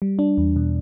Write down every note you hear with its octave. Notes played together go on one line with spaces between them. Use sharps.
G3
D4
E2
B2